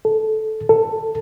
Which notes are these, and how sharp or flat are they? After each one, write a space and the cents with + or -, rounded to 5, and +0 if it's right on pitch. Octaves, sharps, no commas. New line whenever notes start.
A4 -15
A4 +10